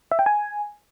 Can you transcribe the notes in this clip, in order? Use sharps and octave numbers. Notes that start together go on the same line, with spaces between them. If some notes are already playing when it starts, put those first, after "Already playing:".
E5
G5
G#5